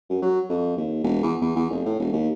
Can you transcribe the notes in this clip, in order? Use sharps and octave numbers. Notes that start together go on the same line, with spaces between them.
F#2
F#3
F2
D#2
E1
E2
E2
E2
F1
A2
E1
D#2